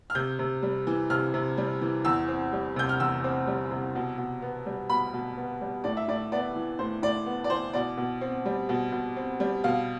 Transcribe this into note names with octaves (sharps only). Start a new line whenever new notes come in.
F6
C3 G6
C3
G3
E3
C3 F6
C3
G3
E3
E2 E6
C4
G3
C3 G6
F6
E2 E6
C4
G3
C3
B2
B2
B3
G3
B2 B5
B2
B3
G3
A2 D5
E5
A2 D5
B3 D5
E3
A2 C5
A2 D5
B3
D5
E3 C5
B2 D5
B2
C4
G3
B2
B2
C4
G3
B2 F5